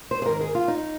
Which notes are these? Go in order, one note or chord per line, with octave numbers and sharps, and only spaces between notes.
C5
G#4
G#2 D#3 A#4
G#4
F4
D#4